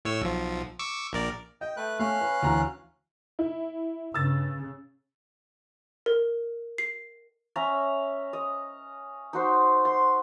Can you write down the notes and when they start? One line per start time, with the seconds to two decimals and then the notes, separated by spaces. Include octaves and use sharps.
0.05 A2 C#5 E6
0.21 B1 F3
0.79 C#6 D6 E6
1.13 A#1 A#4 D5
1.61 D#5 G5
1.77 A3 B4 F#6
1.99 A3 C#4 F5 F#6
2.21 B4
2.42 D2 E3 A#5
3.39 E4
4.14 G2 C#3 E6 A6
6.06 A#4
6.78 C7
7.56 C#4 E5 A#5
8.33 D#5
9.33 D#4 F#4 C5
9.85 C6